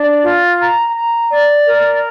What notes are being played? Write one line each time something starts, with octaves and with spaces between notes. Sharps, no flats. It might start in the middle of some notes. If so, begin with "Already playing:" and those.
Already playing: D4 D5
F4
A#5
A#5
D5
A#4